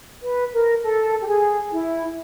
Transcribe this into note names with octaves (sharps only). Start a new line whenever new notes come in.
B4
A#4
A4
G4
G#4
E4